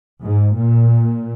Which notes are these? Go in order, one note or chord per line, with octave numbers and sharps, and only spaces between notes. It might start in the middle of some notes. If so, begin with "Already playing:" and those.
G#2
A#2